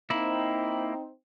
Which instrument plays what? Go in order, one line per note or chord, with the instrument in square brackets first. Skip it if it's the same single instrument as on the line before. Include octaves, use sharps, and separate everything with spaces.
[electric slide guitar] A#3 E4 [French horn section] C4 D#4